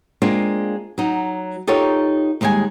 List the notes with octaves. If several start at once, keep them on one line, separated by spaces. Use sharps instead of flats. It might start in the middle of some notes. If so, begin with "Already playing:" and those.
G#3 A#3 C4 D4 F4
F#3 D#4
D#4 F4 G4 A4 A#4 C#5
D#2 G3 G#3 E5 G#5